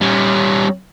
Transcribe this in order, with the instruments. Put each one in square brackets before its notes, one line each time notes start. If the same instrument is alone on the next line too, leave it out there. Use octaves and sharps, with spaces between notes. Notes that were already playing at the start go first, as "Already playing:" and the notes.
[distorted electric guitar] G3 C#4